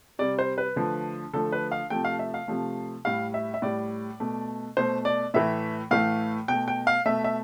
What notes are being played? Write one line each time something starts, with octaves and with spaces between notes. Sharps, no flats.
C3 G3 D5
C5
B4
D3 F3 A3
D3 F3 A3 A4
B4
F5
C3 F3 A3 G5
F5
E5
F5
C3 F3 A3
A2 G3 F5
E5
E5
A2 G3 D5
B2 A3
B2 A3 C5
D5
A2 E3 A3 E5
A2 E3 A3 F5
B2 A3 G5
G5
F5
B2 A3 E5
E5